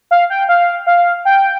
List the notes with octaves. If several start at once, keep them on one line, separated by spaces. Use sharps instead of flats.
F5
G5
F5
F5
G5